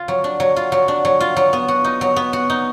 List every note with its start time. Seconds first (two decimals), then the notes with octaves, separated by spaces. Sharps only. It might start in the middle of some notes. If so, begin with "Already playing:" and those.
Already playing: F4
0.08 F#3
0.24 D4
0.40 F#3
0.56 F4
0.72 F#3
0.88 D4
1.05 F#3
1.20 F4
1.36 F#3
1.53 B3
1.68 F#4
1.84 D#4
2.01 F#3
2.16 B3
2.33 F#4
2.50 D#4